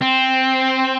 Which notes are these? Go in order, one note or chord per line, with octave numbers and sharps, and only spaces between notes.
C4